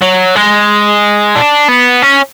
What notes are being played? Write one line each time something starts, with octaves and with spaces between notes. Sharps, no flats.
F#3
G#3
D4
B3
C#4